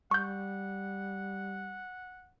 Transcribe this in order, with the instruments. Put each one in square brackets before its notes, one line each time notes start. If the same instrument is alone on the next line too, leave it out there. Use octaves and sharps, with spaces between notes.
[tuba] G3 [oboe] F#5 [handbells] C#6 G6